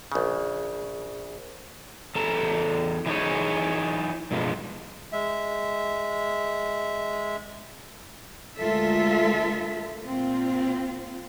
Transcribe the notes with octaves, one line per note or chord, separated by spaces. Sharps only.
A#1 C#3
E2 A4 A5 A#5
E3 D#4 E4 G#4 C#5
G2 B2 F3 G#3
G#3 E5
D2 G#3 F4 A4 A#4 E5
A#2 C4 F4